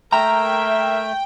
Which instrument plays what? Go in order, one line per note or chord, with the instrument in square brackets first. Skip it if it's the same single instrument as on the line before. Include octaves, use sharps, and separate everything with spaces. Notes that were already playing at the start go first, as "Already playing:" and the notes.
[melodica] A3 [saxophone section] A#3 A#4 E5 [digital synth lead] G5 [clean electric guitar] A#5